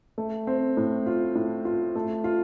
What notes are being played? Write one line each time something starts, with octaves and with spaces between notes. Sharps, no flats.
A3
C4
A2
F4
A2
F4
A3
F4